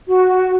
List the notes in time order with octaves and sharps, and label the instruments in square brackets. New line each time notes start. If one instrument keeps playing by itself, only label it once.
[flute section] F#4